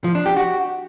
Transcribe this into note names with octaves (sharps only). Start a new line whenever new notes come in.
F3
D4
G4
F#4